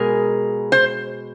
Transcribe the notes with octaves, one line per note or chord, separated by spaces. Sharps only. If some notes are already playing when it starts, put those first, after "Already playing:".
Already playing: B2 G#3 G#4 A#4
C5